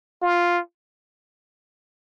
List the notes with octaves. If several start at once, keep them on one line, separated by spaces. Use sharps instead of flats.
F4